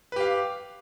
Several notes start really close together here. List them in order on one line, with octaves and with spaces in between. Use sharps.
B4 G4 F5